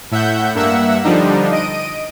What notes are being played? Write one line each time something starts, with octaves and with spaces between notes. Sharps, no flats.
A2 E5 F#5 G6
G2 A#3 E5 F#5 E6
D3 F3 G3 D4 D#4
D#5 D7 D#7